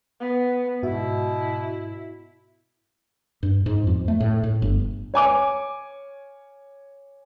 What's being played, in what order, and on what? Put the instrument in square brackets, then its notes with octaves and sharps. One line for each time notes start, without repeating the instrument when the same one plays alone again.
[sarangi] B3
[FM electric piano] G#2 F#4 E5 [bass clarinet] B2 [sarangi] E4
[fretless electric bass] G2
G#2
F2
A3
A2
A2
G1
[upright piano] C#5 G#5 D6